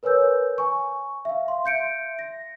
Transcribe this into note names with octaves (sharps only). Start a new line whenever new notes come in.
A#4 B4 C#5 G#5 E6 G6
G#5 C#6
E5 F5
F5 C6
E5 G6 C#7 D7
A#6